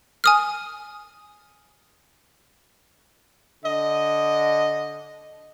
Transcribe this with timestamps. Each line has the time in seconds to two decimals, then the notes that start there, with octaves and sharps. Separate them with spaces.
0.24 G#5 D#6 F6
3.64 D3 D#5